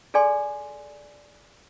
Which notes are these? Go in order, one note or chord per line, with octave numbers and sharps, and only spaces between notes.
G#4 A4 D5 G#5 C6